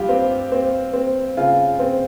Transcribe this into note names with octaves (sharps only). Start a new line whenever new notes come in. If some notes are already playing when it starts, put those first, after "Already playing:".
Already playing: G2 F4 G4
C4
C4
C4
C#3 F4
C4